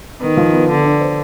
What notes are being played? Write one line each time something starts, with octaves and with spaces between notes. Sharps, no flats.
D#3 B3
F3
B3
D3 B3
D4
C5